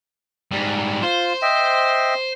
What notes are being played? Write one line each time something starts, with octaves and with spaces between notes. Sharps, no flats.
G#2 G3
F4 C5 C6
D#5 E5 G5